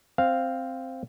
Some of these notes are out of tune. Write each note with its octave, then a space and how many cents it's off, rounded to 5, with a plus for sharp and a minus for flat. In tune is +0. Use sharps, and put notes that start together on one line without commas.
C4 +0 F5 +0